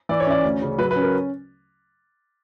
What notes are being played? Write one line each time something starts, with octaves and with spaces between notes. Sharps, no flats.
E3 D5
C#5
C#4 D5
D2
C#3
F#3 B4
B4
C#4
A#4